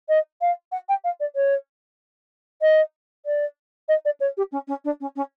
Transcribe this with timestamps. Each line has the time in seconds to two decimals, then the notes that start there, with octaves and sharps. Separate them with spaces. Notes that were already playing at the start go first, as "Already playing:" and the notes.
0.08 D#5
0.41 F5
0.72 F#5
0.88 G5
1.04 F5
1.20 D5
1.35 C#5
2.61 D#5
3.26 D5
3.88 D#5
4.05 D5
4.20 C#5
4.37 G4
4.52 C#4
4.67 C#4
4.84 D4
5.00 C#4
5.16 C#4